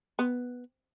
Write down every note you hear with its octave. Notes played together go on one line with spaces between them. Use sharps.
B3